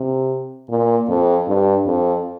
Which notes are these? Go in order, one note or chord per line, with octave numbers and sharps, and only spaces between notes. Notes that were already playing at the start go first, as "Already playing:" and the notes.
Already playing: C3
A#2
F2
G2
F2